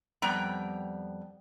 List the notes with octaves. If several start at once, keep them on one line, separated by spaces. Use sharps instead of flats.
F2 G3 B3 G5 A#5